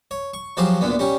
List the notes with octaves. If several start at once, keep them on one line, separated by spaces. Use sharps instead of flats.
C#5
C#6
F3 F#3 G4 G#4 C5
D2 A#2 D3 B3
G3 C#4 G4